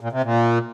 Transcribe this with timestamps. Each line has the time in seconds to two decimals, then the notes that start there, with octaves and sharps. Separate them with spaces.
0.01 A#2
0.12 C3
0.24 A#2